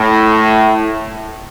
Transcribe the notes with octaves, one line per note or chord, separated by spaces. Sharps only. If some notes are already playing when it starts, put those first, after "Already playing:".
Already playing: A2